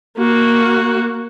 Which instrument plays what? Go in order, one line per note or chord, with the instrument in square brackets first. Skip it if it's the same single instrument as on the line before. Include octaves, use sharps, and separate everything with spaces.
[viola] A#3 F#4